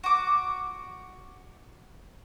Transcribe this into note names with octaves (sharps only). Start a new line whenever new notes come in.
F#4 D6